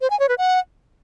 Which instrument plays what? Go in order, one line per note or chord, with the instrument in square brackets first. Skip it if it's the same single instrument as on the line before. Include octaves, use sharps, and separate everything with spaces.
[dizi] C5
G#5
C#5
B4
F#5